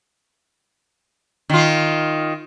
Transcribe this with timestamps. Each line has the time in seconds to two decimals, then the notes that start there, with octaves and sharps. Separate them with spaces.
1.50 D#3 F4